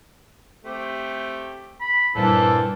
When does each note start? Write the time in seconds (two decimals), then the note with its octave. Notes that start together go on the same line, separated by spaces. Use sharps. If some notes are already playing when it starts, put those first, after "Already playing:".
0.65 A3 C4 G4
1.81 B5
2.15 G2 A#2 E3 A#3 C4 A4